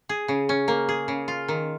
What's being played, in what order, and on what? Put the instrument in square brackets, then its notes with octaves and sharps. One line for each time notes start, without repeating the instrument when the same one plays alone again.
[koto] G#4
C#3
C#4
A#3
G#4
C#3
F4
D#3